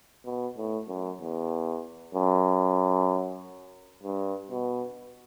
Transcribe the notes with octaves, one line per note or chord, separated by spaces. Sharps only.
B2
A2
F#2
E2
F#2
G2
B2